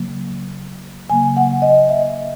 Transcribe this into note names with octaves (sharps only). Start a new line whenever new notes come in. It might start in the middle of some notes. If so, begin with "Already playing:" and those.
Already playing: C#3 F#3 A#3
C#3 F#3 A#3 G#5
F#5
D#5
E5